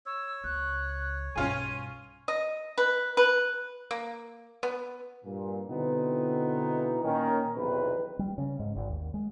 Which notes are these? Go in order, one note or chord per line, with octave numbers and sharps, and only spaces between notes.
C#5 E6
C#2 C#3 F#6
B1 G2 C#4 F4 G#4 D#7
D#5
B4
B4
A#3
B3
G2 A#2
B2 D3 E3 B3 C4 D#4
A#2 D#3 C#4 A#4
B1 E2 C3 D#3 B4
G3
C#3
G#2
G#1
D#2
G#3